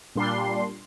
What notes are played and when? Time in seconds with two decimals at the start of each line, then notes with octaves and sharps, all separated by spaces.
0.15 A#2 G3 D4 C6